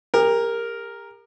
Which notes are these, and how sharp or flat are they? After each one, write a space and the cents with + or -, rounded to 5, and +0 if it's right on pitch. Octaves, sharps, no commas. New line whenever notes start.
G4 +45 A#4 +0